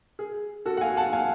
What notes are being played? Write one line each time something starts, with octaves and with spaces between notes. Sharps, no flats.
G#4
F#4 A4
F#5
F5 G#5
F#5 A5
F5 G#5